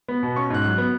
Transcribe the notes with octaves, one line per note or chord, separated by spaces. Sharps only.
B3
B2
C#4 C#6
G#2 F#6
F#3 F#6
B3